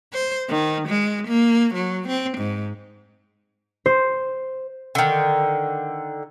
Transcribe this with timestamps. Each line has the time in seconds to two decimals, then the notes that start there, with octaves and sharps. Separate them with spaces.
0.13 C5
0.49 D#3
0.88 G#3
1.27 A#3
1.74 F#3
2.08 C4
2.37 G#2
3.86 C5
4.95 D3 D#3